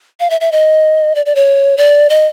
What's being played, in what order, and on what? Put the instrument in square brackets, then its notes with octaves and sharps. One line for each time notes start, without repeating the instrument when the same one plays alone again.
[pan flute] F5
E5
E5
D#5
D5
D5
C#5
D5
D#5